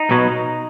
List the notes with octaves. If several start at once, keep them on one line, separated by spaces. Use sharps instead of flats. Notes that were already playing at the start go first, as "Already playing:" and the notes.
Already playing: D#4
B1 B2 F#3